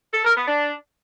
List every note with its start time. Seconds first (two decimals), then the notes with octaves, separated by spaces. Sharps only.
0.14 A4
0.25 A#4
0.36 B3
0.47 D4